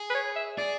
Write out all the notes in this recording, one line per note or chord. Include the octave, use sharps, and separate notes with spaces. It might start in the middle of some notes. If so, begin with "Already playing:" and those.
Already playing: G#4
B4
C#5
E5
G#4 D5